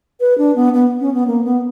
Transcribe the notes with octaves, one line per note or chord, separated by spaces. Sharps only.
B4
D4
B3
B3
C#4
B3
A#3
B3